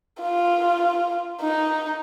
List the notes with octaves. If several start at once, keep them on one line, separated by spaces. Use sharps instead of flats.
F4
D#4